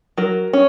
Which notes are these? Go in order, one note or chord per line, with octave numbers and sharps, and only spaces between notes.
F#3 A#4
C#4